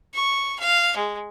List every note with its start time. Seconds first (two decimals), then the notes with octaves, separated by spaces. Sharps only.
0.14 C#6
0.59 F5
0.96 G#3